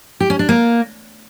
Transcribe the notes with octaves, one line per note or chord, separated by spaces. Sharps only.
G4
C#4
D4
A#3